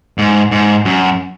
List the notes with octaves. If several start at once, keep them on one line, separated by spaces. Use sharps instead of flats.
G#2
G#2
F#2